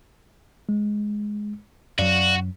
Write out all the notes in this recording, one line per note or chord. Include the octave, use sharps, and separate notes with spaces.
G#3
F#2 F#3 F#4 D5 F5